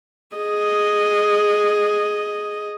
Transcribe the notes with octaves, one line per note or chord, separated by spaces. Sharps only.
G#4 D#5